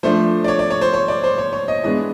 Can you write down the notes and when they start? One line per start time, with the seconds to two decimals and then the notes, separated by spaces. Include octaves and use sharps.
0.03 F3 A3 D4 C5
0.44 D5
0.48 C#5
0.59 D5
0.70 C#5
0.81 C5
0.94 C#5
1.08 D5
1.24 C5
1.38 C#5
1.53 C#5
1.68 D#5
1.83 E3 G#3 B3 D4 D#5